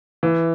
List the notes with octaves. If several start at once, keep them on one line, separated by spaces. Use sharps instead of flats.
E3